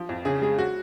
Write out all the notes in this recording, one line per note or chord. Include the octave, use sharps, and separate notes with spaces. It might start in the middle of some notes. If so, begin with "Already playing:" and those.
Already playing: F3
F2
C#3 G#4
G#3 G#4
F#4